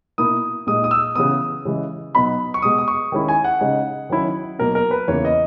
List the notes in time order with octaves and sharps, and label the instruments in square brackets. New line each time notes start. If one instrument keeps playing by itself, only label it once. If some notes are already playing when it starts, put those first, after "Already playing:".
[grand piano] B2 A#3 E4 D#6
A#2 G#3 D#4 D#6
D#6
E6
C#3 E3 B3 D#6
C#3 E3 G#3
B2 F#3 B3 D#4 B5
C#6
B2 G#3 B3 D#6
D#6
C#6
D#3 G#3 C#4 E4
G#5
F#5
C#3 G#3 D#4
D#3 F#3 C#4 E4
B2 F#3 A#3 A#4
A#4
B4
E2 C#3 E3 A#3 E4 C#5
D#5